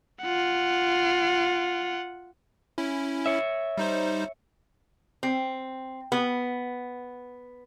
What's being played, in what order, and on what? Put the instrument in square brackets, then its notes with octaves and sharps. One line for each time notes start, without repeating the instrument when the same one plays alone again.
[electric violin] F4 F#5
[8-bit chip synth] C#4 E4
[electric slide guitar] C#5 E5
[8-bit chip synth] G3 D#4 C5
[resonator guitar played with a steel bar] C4
B3